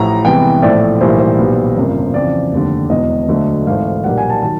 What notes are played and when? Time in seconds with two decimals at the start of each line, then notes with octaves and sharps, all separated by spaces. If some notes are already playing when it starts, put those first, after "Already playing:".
Already playing: A1 A2 F3 A#5
0.24 C2 C3 E3 G#3 B3 G5
0.62 A#1 A2 F3 A3 D5
1.01 B1 A2 E3 G3 A#3 C5
1.19 C5
1.38 B1 A#2 G3 B3
1.77 G1 F2 C#3 F3 A#3
2.14 F2 C#3 E3 D5
2.52 F1 D#2 D3
2.90 E1 E2 B2 D#5
3.28 D2 D3 F#3 A3
3.66 G#1 G#2 E3 A3 F5
4.04 B1 A#2 G3 A#3 F#5
4.18 G#5
4.30 A5
4.42 D#3 F#3 A5